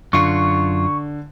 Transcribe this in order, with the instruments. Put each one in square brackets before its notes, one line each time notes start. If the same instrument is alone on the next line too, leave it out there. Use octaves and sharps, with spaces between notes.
[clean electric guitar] F#2 F4 [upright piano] D3 [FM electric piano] C#6